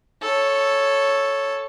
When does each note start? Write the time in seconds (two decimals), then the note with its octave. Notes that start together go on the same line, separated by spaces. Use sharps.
0.22 A4 C#5